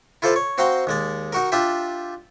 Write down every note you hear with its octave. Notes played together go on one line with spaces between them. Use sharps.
E4 F4 A4 C5 D5 F5
C#5
C4 F#4 F5 G5 A#5 C6
D#2 G#3 D5
D#4 F#4 A#4
D4 F4 G4 E5 G5